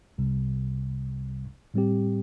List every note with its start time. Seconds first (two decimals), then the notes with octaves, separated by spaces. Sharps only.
0.18 C2 C3 G3
1.74 A2 G3 C4 G4